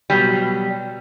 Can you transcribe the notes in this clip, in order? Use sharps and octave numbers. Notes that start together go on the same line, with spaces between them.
B2 F#3 G3